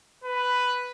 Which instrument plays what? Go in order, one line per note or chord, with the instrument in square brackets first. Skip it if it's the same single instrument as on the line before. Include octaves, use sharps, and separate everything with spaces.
[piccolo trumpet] B4